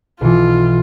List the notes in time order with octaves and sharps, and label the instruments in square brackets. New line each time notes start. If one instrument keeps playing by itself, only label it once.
[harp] B1 E3 [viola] F4